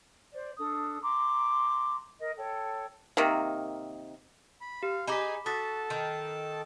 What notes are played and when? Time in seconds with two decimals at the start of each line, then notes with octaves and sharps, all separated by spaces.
0.33 C5 D5
0.57 D4 A4 D#6
1.01 A#5 C6 D6
2.18 A#4 D#5
2.36 A4 C#5 G5
3.17 C3 D#3 A#3
4.61 B5
4.83 G4 F5
5.08 D#4 G#4 G#5 B5 D6 B6
5.46 F#4 A4 A5 D#6 A6 B6
5.90 D#3